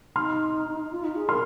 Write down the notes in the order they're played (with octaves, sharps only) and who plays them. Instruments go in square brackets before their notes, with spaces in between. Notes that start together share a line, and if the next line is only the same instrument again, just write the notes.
[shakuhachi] D#4 [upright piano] C6 F6
[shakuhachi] F4
D#4
G#4
[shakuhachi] A#4 [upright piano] C6 F6